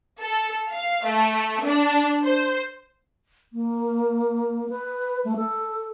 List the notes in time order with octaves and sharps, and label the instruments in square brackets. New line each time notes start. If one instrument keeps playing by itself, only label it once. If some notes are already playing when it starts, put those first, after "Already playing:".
[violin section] A4
F5
A3
D4
C5
[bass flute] A#3
B4
A3
A4